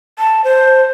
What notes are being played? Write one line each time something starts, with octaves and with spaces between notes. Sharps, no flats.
A5
C5